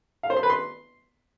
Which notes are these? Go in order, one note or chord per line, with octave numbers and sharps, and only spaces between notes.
F5
C5
C6
B4
C6